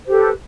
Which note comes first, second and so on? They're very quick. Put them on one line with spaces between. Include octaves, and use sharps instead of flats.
C5 G4 A4 B4